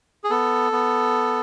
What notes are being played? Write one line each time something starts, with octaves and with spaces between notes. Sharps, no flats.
G#4
B3 A4
B3